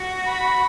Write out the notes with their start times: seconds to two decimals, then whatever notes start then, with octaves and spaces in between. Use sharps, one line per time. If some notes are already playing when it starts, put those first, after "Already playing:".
Already playing: F#4
0.26 B5